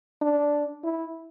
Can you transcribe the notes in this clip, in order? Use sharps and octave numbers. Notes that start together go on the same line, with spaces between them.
D4
E4